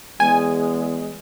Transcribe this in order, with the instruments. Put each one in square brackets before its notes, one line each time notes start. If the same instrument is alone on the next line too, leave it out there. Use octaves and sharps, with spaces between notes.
[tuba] E2 [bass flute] G#3 [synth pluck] G#5